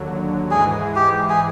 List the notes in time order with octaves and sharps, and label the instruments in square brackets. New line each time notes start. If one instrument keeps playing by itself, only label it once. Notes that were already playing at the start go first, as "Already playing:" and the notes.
Already playing: [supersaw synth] D#2 D3 F#3
[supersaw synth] G#2 E3 G#3 [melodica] G#4
[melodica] G4
G#4